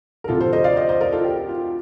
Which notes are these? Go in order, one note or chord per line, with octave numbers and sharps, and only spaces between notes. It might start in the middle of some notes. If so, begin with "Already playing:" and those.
A#4
D2 C3 F3 F4 A4
A4 C5
C5 D#5
D5 F5
C5 D#5
C5 D#5
A#4 D5
F4 A4
G4
F4